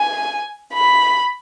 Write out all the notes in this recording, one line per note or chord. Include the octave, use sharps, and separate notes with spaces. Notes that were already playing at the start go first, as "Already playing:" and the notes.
Already playing: G#5
B5